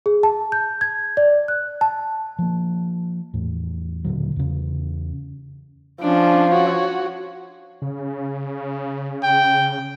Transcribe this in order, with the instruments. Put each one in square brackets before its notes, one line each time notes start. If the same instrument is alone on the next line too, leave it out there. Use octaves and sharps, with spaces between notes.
[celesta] G#4
A5
G6
G#6
D5
F#6
A5
[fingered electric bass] F3 A#3
E2 A2
D#1 D2 D3 F#3
E2 C#3
[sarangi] F3 [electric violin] C#4 D4
[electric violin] F#4 C#5
[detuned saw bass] C#3
[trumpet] G5